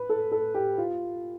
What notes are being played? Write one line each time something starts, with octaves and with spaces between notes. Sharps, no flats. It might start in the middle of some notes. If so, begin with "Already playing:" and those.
Already playing: B4
A4
A4
G4
F4